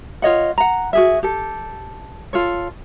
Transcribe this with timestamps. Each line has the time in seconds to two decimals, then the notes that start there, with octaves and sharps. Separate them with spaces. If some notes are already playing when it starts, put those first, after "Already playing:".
0.22 F4 C#5 D#5 F#5
0.58 F#5 A#5
0.93 F#4 G#4 E5
1.23 G4 A4
2.33 F4 A4 C#5